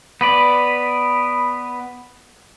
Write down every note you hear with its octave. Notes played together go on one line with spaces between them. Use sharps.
B3 B4 D5